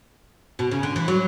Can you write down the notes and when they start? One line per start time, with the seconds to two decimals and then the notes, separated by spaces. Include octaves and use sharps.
0.59 B2
0.71 C#3
0.83 D3
0.96 E3
1.08 F#3